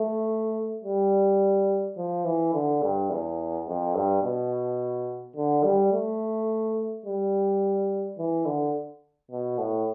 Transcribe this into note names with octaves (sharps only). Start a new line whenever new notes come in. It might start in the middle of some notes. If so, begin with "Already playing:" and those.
Already playing: A3
G3
F3
E3
D3
G2
E2
F2
G2
B2
D3
G3
A3
G3
E3
D3
B2
A2